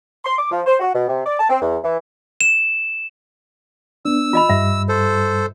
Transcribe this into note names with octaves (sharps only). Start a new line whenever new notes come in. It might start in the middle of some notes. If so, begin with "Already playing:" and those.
C6
D6
F3
C5
F#4
B2
C3
D5
A5
C4
E2
E3
E7
B3 D4 E6
F4 D#5 B5
G2 G3 E5
A4 C5